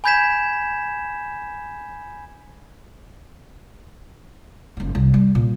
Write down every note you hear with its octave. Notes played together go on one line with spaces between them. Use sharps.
G#5 B5 G6 G#6 B6 E7
F#1 G#2
C2
G3
A#2